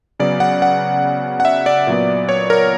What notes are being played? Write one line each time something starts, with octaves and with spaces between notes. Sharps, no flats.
C#3 F#3 B3 D5
F#5
F#5
F#5
E5
D5
A#2 F#3 B3
C#5
A#4